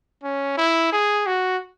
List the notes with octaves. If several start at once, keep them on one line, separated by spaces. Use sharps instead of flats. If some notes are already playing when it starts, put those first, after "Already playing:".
C#4
E4
G#4
F#4